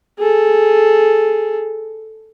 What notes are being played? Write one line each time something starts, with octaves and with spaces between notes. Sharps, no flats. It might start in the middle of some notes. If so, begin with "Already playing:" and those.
G#4 A4